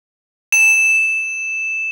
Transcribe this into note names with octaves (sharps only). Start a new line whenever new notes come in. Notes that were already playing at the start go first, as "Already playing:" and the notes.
E7